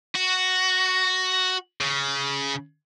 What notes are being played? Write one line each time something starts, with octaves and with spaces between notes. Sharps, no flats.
F#4
C#3